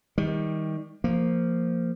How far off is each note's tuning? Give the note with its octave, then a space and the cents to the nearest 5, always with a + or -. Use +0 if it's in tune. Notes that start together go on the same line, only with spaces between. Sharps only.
D#3 +25 G3 +25
F3 -10 A#3 -15